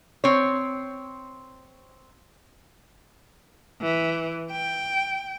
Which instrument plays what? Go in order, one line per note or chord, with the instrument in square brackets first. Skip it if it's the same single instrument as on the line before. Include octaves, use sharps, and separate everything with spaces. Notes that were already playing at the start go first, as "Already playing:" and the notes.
[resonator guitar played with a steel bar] C4 C#5
[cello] E3
G5